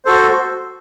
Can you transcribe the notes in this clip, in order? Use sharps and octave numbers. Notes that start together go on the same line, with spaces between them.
F#4 A4 C5